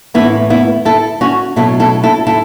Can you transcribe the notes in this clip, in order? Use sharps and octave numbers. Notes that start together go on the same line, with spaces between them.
A2 E3 A3 B3 E4
B3 E4
E4 A4
C#4 F#4
B2 F#3 A3 E4 A4
E4 A4
E4 A4
E4 A4